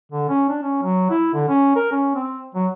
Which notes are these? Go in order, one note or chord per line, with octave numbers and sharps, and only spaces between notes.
D3
C#4
D4
C#4
F#3
E4
D3
C#4
A#4
C#4
C4
F#3